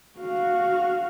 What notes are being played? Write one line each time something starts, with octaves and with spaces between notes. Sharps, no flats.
F#4 F5